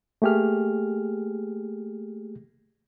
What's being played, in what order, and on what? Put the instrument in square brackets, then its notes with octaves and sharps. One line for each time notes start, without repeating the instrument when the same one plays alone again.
[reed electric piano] A3 A#3 G4 G#4 F6